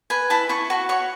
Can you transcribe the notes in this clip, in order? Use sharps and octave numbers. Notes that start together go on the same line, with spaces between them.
B4 G#5
E4 A5
E4 C#6
F#4 C#6
C#5 C#6